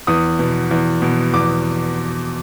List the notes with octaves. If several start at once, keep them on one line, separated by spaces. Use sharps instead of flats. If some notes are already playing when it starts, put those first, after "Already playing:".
E2 D#6
B2
E2
B2
E2 D6